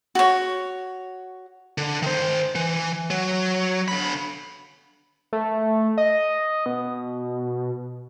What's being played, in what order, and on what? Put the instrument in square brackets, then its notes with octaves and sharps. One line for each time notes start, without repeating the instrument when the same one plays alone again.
[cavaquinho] F#4 C#5
[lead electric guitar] D3
D#3 C5
E3
F#3
D3 B5
[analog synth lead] A3
D#5
B2